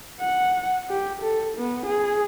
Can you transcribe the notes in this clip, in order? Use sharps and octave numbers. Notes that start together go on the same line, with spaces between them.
F#5
G4
A4
B3
G#4